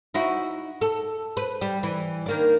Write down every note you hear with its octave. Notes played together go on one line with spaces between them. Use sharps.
D#4 E4 F#4
A4
B4
G3
E3
D#3 A#3 D4